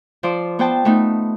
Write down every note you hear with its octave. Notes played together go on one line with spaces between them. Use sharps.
F3 C5 D5
B3 C5 G5 A5
A3 B3 D#4